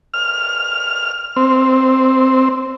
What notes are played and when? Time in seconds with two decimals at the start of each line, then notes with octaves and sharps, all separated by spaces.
0.14 F6
1.36 C4